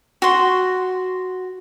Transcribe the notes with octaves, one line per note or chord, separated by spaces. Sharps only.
F#4 C6